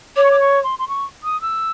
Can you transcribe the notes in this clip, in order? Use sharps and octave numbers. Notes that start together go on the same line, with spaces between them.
C#5 D6
C#6
D6
C#6
C6
C6
C#6
D#6
E6